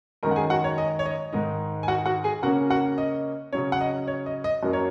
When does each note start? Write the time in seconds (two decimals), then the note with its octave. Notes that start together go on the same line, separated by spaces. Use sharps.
0.23 F#2 D#3 G#3 A#4 A#5
0.31 F#5
0.36 G#4 G#5
0.50 F#4 F#5
0.64 C#5
0.78 D#5
0.99 C#5
1.06 D#5
1.33 G#2 D#3 G#3 D#4 D#5
1.83 G#5
1.88 F#4 F#5
2.06 F#4 F#5
2.24 G#4 G#5
2.43 C#3 A#3 C#4 F#4 F#5
2.70 F#4 F#5
2.98 D#5
3.53 C#3 F#3 C#4 C#5
3.72 F#5
3.81 D#5
4.08 C#5
4.26 D#5
4.44 D#5
4.63 F#2 F#3 A#3
4.73 C#5